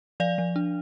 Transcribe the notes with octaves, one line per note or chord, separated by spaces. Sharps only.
F3 D5 F5
F3
D4